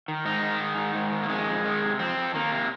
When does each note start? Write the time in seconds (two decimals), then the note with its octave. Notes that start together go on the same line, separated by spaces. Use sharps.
0.08 D#3
0.25 G#2 D#4
0.42 D#3
0.60 G#2
0.77 D#3
0.95 G#2
1.12 D#3
1.23 A#3
1.29 F2 G#3
1.47 F2
1.65 D#3
1.82 C3
1.99 F2 C4
2.17 F2
2.35 D#3 A#3
2.52 C3